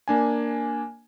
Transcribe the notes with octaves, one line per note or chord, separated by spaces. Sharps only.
A#3 D4 G#5